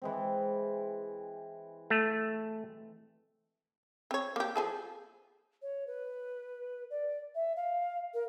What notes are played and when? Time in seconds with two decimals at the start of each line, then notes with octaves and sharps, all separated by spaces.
0.02 E3 G#3 C4
1.90 A3
4.11 C4 C#5
4.36 A#3 G4
4.56 F3 G#4 A4
5.62 C#5
5.87 B4
6.90 D5
7.35 E5
7.57 F5
8.14 A#4